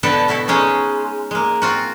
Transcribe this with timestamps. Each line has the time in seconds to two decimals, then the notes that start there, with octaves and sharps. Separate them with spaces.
0.03 B2 D3 B3 A4 G5 A5
0.28 B2 A3 E4 A4
0.48 G#3 C#4 D#4 G#4
1.31 G#3 A#3
1.62 C4 F4 F#4